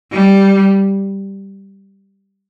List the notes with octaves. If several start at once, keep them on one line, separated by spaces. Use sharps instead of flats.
G3